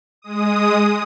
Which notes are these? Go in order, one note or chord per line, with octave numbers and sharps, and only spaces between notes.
G#3 D#6